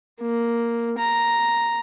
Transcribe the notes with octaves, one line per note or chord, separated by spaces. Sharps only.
A#3
A#5